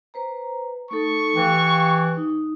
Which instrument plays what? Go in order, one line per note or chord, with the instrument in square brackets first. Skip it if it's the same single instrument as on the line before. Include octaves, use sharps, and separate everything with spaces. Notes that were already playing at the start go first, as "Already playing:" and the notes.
[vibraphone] B4 C5 A#5
[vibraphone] A3 D#4 A4 [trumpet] C#6
[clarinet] E3 [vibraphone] G4 F5 G5
[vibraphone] D#4